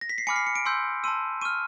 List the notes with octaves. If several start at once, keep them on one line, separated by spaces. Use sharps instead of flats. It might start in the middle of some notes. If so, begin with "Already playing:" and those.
A#6
B6
C7
G#5 B5 D6 F6 C#7
C7
C#7
D7
G#5 C6 E6 G6
A5 C6 E6 D#7
C#6 F6 D#7